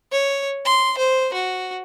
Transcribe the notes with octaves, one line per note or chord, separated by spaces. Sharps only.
C#5
C6
C5
F#4